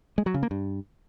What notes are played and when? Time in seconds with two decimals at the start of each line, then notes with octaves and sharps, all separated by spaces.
0.18 G#3
0.26 F#3
0.34 C#3
0.43 A#3
0.51 G2